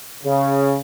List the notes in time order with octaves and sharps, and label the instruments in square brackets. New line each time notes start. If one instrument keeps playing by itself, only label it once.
[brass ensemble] C#3